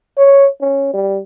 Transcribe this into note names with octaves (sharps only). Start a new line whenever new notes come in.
C#5
C#4
G3